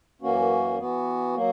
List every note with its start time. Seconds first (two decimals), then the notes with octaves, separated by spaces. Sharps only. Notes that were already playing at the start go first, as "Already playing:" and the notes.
0.22 F#2 E3 A#3 C#4 F#4
0.78 E3 B3 F#4
1.34 F#3 A#3